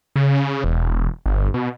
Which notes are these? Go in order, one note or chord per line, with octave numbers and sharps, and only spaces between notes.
C#3
E1
G1
B2